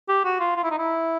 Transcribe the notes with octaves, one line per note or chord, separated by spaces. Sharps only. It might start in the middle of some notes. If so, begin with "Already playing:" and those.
G4
F#4
F4
F4
E4
D#4
E4